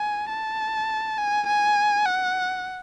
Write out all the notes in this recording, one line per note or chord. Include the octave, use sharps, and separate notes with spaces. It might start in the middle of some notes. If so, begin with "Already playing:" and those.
Already playing: G#5
A5
G#5
G#5
F#5